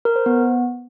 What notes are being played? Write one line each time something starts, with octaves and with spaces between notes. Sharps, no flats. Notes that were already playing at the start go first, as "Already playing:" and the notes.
A#4
C5
B3